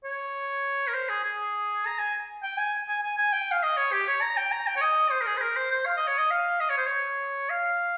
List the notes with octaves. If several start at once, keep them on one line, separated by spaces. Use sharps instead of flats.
C#5
A#4
C5
G#4
G#4
A#5
G#5
G5
G#5
G#5
G#5
G#5
G5
F5
D#5
C#5
G4
C#5
A#5
G5
A#5
G5
C#5
D#5
C5
A#4
G#4
C5
A#4
C5
C5
F5
D#5
C#5
D#5
F5
D#5
C#5
C5
C#5
F5